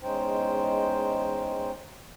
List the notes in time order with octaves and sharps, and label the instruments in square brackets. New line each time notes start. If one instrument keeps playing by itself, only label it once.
[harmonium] E2 G#3 C#4 D#4 C5 G5